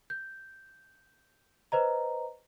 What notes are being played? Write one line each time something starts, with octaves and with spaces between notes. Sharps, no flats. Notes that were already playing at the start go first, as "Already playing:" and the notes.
G6
B4 C5 D#5 A#5